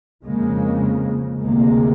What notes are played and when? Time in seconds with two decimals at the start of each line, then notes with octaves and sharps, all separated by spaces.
0.24 F2 C#3 G#3 A#3
1.40 D2 C3 G#3 A#3